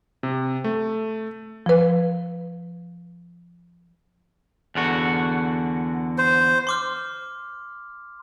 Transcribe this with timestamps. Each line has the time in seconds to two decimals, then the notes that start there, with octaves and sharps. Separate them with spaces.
0.23 C3
0.64 A3
1.66 F3 B4
4.75 E2 D3 F#4
6.18 C5
6.67 C6 D6 F6